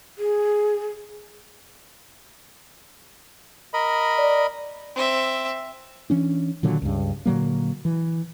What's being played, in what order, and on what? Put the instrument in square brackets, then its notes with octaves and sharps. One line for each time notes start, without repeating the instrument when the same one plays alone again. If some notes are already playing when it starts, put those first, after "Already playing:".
[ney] G#4
[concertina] A#4 D#5 B5
[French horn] D5
[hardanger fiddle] C4 E5
[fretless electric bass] E3 C#4 D4
A#2 D3 D#3 F#3
C#2 G2
A#2 D3 F#3 A#3
E3